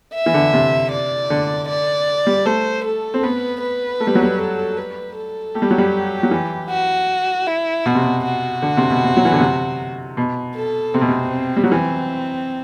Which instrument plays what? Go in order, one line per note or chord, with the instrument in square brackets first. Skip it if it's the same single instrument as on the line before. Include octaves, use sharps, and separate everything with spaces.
[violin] E5
[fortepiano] E3
D3
C3
[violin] D5
[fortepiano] D3
[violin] D5
[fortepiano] G3
[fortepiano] A3 [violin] C5
[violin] A4
[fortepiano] C4
[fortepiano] B3 [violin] B4
[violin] B4
[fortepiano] A3
G3
F#3
G3
[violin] A4
B4
A4
[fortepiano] A3 [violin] G4
[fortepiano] G3
F#3
G3
F#3
E3
[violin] F#4
E4
[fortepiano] B2 [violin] F#4
[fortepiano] C3
B2
[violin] F#4
[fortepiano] D3
C3
B2
C3
F#3
E3
D3
C3
B2
[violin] A4
[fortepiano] C3 [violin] C4
[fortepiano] B2
C3
G3
F#3
[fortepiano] E3 [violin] C4